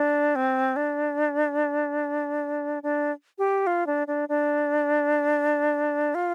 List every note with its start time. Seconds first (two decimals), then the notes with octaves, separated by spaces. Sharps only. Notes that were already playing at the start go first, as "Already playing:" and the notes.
Already playing: D4
0.36 C4
0.76 D4
2.83 D4
3.38 G4
3.67 F4
3.87 D4
4.07 D4
4.29 D4
6.15 F4